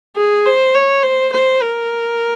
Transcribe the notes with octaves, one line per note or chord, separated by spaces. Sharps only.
G#4
C5
C#5
C5
C5
A#4